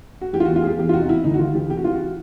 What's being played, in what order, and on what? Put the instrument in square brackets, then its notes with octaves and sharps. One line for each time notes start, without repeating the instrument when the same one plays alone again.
[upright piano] F#4
E3 G4
F4
F#4
E2
F4
E3 G4 G#4
E2 G4
F4
C3 F#4
D#4
E2 E4
D2 D#4
F#4
D2 F4
E3 G4
C3 G4
F#4
E3 F4
F#4